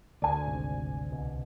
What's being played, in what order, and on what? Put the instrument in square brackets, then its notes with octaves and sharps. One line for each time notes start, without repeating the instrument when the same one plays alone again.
[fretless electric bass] D2 [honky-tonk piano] D5 G#5
[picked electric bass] G#1 C3
C2 B2